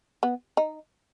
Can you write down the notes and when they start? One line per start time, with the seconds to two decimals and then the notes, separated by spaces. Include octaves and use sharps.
0.23 B3
0.57 D#4